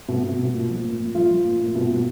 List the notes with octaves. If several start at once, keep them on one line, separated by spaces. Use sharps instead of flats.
B2
B2
B2
A#2
F3
A#2
A#2
F3 F4
F3
A#2
A#2
B2
B2